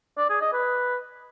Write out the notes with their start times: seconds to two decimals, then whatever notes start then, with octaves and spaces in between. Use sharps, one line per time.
0.18 D5
0.30 G#4
0.41 D#5
0.53 B4